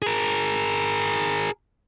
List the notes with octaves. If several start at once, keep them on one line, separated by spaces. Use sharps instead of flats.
G#4 A#4